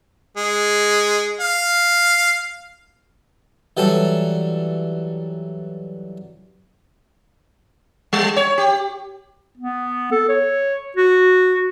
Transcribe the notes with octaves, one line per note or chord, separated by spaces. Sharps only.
G#3
F5
E3 F#3 G3 A4
G3
C#5
G4
B3
A4
C#5
F#4